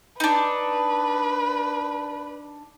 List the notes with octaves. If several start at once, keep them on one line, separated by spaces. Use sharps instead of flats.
D4 D#4 B4